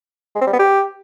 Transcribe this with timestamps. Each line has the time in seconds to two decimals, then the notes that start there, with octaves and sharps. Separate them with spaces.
0.35 G#3
0.41 C4
0.47 G3
0.53 B3
0.59 G4